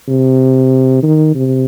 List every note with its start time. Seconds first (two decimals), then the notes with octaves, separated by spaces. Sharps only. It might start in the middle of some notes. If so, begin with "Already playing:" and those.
0.08 C3
1.03 D#3
1.35 C3